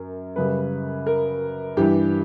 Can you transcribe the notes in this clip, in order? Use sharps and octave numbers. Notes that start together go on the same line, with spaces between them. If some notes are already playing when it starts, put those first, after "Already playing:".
Already playing: F#2 A#4
F#2 C#3 G3 B4
A#4
G2 E3 G3 G4